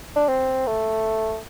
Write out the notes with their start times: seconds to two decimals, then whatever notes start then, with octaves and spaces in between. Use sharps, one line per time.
0.16 D4
0.28 C4
0.67 A3